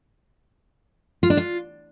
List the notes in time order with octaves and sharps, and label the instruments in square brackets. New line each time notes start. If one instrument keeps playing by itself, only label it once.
[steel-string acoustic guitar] F4
D4
F4